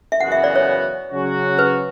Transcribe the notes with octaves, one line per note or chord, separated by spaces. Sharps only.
E5
F#2 C#3 E3 B3 F#4 F#5
E5
D5
C#5
C#3 F#3 C#4 F#4
B4